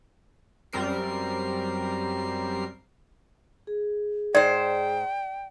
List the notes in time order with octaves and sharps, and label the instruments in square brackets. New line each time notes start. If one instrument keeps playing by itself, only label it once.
[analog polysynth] F#2 G3 C4 A#4 C7
[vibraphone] G#4
[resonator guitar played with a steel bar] G#2 C5 [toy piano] D5 [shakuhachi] G5